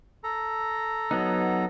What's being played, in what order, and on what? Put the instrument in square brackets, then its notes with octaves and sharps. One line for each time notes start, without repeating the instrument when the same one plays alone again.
[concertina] A4 A#5
[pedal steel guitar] F#3 B3 D#4